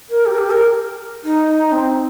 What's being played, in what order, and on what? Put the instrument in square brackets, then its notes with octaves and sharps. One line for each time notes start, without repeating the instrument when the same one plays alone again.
[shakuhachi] A#4
G4
A#4
G4
A#4
D#4
C4